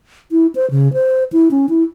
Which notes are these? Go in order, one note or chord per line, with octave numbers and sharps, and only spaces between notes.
E4
C5
C#3
C5
E4
C#4
E4